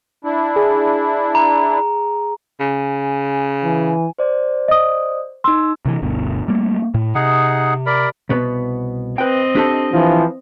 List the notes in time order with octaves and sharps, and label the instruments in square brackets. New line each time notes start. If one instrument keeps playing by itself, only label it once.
[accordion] D4 E4
[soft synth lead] G#4
[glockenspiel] A#5
[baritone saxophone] C#3 [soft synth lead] G#5
[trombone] E3
[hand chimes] C5 D5
[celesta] D#5 D#6
[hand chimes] D#4 E6 [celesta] C6
[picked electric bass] C3 D#3 E3
G1 D2 B2
G3 A3 A#3
A2
[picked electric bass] C3 [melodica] D#4 G#4 F#5
[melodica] A#4 D5 B5
[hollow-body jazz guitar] C2 B2 B3
[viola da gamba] C4 D#5 [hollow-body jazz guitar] B4 G5
[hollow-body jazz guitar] D4 G4 A4
[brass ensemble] E3 F3